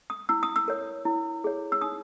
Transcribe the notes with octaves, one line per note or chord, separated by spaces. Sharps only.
D#6
E4 E6
D#6
E6
A#4 C#5
E4
G#4 C#5
E6
D#4 D#6